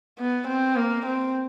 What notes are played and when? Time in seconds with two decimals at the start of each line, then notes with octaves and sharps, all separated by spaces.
0.19 B3
0.48 C4
0.76 A#3
1.06 C4